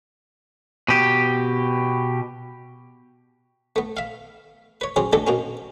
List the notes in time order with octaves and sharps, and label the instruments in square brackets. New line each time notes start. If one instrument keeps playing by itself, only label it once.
[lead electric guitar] B2 G4
[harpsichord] A3 B3
E5 F5
B4 C#5
F#3 C#4 G4 G#4 C5
G#3 A3 B3 D4 G4 A4
B2 A#3 C#4